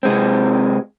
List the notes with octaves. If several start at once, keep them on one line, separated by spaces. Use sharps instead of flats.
C3 G#3 C4